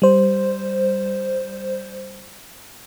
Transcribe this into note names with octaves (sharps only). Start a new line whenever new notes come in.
G3 C5